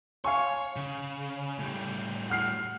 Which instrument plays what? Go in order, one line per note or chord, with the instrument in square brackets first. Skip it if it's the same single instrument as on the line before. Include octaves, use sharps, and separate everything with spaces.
[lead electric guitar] C#5 [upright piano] F5 G#5 C#6
[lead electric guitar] C#3
A2 G3
[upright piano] F#5 F6 C7